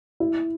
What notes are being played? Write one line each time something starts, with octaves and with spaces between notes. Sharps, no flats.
E4